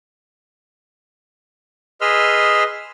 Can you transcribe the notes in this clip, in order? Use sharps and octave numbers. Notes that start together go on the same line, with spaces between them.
G#4 B4 D#5 C6 E6 F6